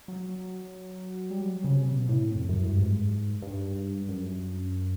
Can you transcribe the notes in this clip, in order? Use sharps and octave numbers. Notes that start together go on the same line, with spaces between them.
F#3
G3
F#3
C#3
C3
B2
A2
F2
F#2
G2
G#2
G2
F#2